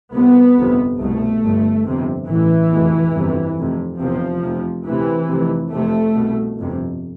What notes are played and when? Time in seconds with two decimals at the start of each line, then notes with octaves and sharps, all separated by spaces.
0.14 C2 C3 B3
0.57 G1 F2 C3
1.00 C2 B2 A3
1.43 G1 G2
1.86 G1 F2 C3
2.29 A1 A2 E3
2.71 F1 E2 B2
3.15 G1 F2 C3
3.58 F1 F2 C3
4.00 F1 E2 C3 F3
4.43 F1 F2 C3
4.86 D2 C3 E3
5.29 F1 F2 C3
5.72 F1 F2 C3 A3
6.15 C2 B2
6.58 G1 F2 C3